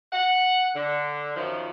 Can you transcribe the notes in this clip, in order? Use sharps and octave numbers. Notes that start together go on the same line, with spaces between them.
F#5
D3
F#2 D#3 F3